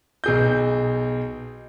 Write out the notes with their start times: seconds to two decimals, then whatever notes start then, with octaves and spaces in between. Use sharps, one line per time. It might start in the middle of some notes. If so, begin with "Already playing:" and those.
0.24 B1 G#4 G6